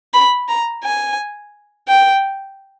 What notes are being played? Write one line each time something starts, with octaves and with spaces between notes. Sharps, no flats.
B5
A#5
G#5
G5